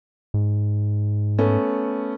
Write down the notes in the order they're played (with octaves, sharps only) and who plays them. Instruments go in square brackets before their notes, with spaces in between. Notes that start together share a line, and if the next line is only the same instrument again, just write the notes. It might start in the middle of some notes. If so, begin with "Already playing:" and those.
[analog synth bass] G#2
[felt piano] A3 B3 C#4